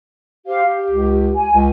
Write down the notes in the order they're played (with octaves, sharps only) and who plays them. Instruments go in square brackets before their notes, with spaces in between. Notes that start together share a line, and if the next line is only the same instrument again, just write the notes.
[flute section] G4 C5 F5
G4
[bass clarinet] C#2
[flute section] G#5
[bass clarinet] C#2